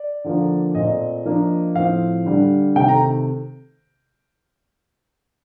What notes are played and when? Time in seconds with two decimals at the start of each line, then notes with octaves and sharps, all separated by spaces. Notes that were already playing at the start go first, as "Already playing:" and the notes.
Already playing: D5
0.24 D3 F3 A#3
0.75 A#2 A3 C4 D#5
1.25 F3 A#3 D4
1.75 A2 F3 C4 F5
2.25 D3 G3 D4
2.75 C3 D#3 A3 D#4 G5
2.88 A#5